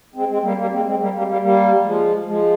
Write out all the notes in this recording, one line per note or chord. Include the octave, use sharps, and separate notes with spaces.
G#3 C4
G#3 C4
G3 A#3
G3 A#3
G#3 C4
G#3 C4
G3 A#3
G3 A#3
G#3
G3 A#3
G3 A#3
F3 G#3
F3 G#3